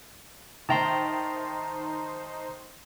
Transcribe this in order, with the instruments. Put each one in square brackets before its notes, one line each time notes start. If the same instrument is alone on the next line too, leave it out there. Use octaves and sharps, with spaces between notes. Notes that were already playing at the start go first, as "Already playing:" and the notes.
[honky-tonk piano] D#3 E5 G5 [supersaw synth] D#4 C5 [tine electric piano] A5 A#5 C6